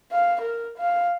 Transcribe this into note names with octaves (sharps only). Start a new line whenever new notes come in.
F5
A#4
F5